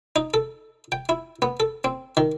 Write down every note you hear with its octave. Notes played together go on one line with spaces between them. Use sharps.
D#4
A4
G5
E4
B3
A4
C4
D#3